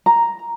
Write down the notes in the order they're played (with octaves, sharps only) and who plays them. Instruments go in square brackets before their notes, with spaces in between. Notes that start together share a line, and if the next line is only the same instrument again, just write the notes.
[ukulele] A#5